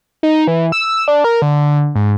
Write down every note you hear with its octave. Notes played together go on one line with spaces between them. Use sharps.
D#4
E3
E6
D4
A#4
D3
G#2